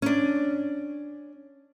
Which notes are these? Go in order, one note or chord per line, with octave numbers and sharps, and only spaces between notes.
C#4 D4